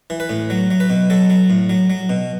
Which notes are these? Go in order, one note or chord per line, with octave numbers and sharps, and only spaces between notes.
E3
B4
A2
F#3
F#3
B4
B2
F#3 A4
F#3
A2
F#3
F#3
B2